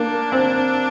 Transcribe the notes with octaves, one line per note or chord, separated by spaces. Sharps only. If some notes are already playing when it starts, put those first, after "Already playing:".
Already playing: A#3 D4
C4